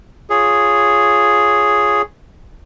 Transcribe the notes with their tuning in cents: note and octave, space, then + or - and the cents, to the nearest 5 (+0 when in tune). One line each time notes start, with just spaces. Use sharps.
F4 +0 G#4 +0 C#5 +0